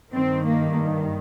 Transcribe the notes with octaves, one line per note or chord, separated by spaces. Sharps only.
G2 D#3 C4
A#3